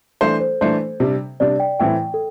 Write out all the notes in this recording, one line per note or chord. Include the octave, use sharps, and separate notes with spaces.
E3 A3 D4 A4 C5
C5
E3 A3 D4 C5
C3 G3 D4
C3 G3 D4 D5
G5
A2 E3 A3 C4 E4 G5
A4